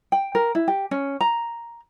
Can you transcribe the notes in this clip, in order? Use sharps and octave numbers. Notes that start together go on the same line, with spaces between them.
G5
A#4
E4
G4
C#4
A#5